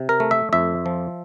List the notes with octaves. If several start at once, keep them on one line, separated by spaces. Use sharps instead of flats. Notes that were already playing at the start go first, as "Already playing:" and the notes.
Already playing: C3
A#4
A3
E5
F2 E5
F3